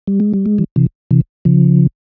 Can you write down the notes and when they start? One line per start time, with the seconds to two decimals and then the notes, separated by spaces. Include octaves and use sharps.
0.07 G3
0.20 G#3
0.34 G3
0.46 G#3
0.58 E3 G3
0.76 C3 E3
1.11 C3 E3
1.45 C#3 F3